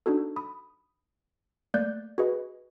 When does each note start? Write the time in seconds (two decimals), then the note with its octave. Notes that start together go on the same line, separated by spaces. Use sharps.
0.06 D4 D#4 F#4 A4
0.36 B5 D#6
1.74 A3 A#3 D5 F#6 G6 A6
2.18 F#4 G#4 B4 D#5